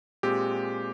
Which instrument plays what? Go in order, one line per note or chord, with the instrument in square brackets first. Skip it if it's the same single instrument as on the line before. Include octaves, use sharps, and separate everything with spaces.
[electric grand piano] A#2 G#3 C4 G4